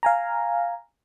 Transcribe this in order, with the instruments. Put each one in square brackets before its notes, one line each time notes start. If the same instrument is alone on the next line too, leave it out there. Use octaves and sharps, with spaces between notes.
[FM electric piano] F5 G#5 A#5